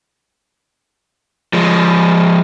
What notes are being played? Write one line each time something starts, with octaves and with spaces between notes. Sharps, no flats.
F3 G#3